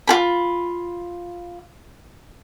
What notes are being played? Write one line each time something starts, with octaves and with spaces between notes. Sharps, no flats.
F4 G#4 B5